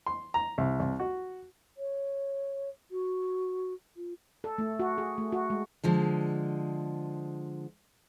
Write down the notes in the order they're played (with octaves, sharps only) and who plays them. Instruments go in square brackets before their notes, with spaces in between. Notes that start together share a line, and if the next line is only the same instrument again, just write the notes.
[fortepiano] C6
A#5
C2
C2
F#4
[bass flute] C#5
F#4
F4
[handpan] A4
A3
F#4
G#4
A3
F#4
G#3
[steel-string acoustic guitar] D3 F3 G#3